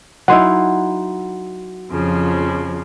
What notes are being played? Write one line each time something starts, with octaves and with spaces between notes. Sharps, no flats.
F#3 D#4 E4 F#5 C6
F2 C#3 F3